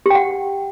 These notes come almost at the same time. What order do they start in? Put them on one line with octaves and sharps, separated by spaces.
G4 G5 F#5